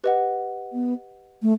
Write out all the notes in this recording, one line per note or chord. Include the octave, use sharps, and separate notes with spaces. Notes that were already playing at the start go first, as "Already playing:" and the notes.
G4 B4 D#5 F#5
B3
A3